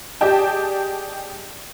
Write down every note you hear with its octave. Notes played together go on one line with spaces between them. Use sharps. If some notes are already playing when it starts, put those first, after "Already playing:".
G4 G#4 D5 D#5 G5 A5